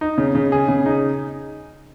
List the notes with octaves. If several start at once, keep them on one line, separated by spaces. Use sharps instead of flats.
D#4
C#3
C#3
G#4
C#3
D#4